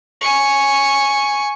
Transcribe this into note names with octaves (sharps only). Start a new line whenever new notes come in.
G#5 C#6